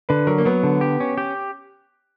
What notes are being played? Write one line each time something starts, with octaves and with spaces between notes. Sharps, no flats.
D3 B4
F#3 A#4
A#3
F#3 B3
D3
G4
C#4
G4